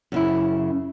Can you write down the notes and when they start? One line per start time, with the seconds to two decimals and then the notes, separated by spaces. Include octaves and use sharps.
0.12 F#2 C#3 E4